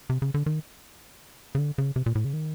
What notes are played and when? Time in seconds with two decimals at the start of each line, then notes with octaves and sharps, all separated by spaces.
0.10 C3
0.22 C#3
0.34 D3
0.46 D#3
1.55 C#3
1.58 D3
1.78 C#3
1.96 C3
2.06 A#2
2.15 A2
2.25 C#3
2.33 D#3